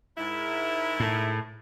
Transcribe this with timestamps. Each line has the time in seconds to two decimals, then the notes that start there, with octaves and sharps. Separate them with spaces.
0.18 G#2 E4 A#4
1.00 A2